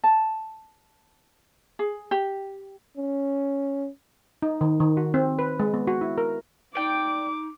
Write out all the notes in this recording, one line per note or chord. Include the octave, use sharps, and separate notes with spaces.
A5
G#4
G4
C#4
D#4
D#3
D#3
F#4
C4
B4
G#3
B3
F#4
E4
A#4
D#4 D5 G5 D6